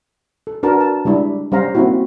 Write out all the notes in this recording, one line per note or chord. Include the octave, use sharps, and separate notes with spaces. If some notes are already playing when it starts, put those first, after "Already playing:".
A4
D4 F#4 A#4 B4 A5
A5
G3 G#3 D4 E4
G3 C#4 C5 F5 A#5
A#3 C4 D#4 E4 F#4